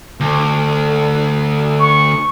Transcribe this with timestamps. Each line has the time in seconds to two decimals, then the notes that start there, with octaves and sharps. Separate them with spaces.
0.20 D2
1.79 C#6